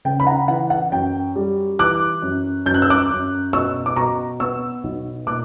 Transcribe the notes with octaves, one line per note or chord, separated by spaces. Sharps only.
C#3 G5
B5
F#5 A#5
E3 F#5
F#5
F#2 G5
G3
E3 D6 F#6
F#2
F#2 G6
F#6
E6
D6 F#6
F#2
B2 C#6 E6
D6
B2 A#5 C#6
B3 C#6 E6
B1
A#2 D6 F#6